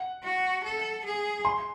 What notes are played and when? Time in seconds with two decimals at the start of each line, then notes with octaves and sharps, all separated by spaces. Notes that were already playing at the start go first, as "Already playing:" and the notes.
Already playing: F#5
0.23 F#4
0.63 A4
1.05 G#4
1.45 G#5 C6